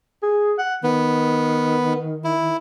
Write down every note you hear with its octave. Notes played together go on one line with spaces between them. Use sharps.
G#4
F#5
D#3 B3
E4